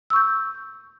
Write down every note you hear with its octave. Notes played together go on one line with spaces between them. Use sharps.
C#6 E6 G6